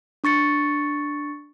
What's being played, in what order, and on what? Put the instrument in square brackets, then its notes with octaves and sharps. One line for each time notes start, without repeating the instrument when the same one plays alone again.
[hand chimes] D4 C#6 A6 C#7